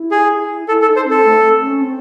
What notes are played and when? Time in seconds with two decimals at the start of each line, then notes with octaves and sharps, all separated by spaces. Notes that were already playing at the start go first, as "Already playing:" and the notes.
Already playing: E4
0.11 G#4
0.68 E4 A4
0.82 A4
0.86 D#4
0.96 C5
1.05 C4
1.11 A4
1.24 A3
1.43 C4
1.62 C#4
1.81 C4